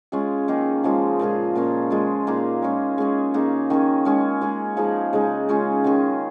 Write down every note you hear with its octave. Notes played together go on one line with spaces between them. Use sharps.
G#3 C#4 F4 G#4
D#3 A#3 D#4 G#4
C#3 F3 G#3 F4
A#2 G#3 F4 G#4
A#2 A#3 C#4 F4
G#3 F4 G#4
A#2 A#3 D#4 G#4
G#3 C#4 F4
G#3 C#4 G#4
C#3 A#3 D#4 G#4
D#3 C#4 G#4
G#3 C#4 G#4
G#3 C#4 G#4
F3 G#3 D#4 G#4
C#3 G#3 D#4 G#4
G#3 C#4 F4 G#4
D#3 C#4 G#4